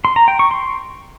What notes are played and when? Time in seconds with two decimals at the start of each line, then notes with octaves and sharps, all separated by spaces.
0.05 C6
0.16 A#5
0.28 G5
0.39 C#6
0.51 C6